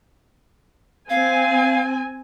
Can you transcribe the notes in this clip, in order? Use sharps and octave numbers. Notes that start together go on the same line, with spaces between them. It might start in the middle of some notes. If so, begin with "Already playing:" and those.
C4 F5 G#5